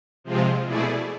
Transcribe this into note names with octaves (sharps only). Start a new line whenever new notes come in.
C3 F3 G#3 C4 F4
B2 A3 E4 G#4 D5